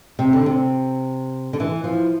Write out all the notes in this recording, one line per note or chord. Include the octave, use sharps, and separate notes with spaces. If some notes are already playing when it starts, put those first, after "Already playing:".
C3
D3
C3
D3
E3
F3